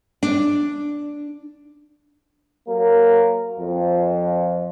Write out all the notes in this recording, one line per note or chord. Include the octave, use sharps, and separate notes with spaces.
D4
F#3 A#3 A#4
F2 F3